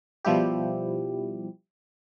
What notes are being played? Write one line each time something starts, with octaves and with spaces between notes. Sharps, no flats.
B2 F3 G3 E4 G4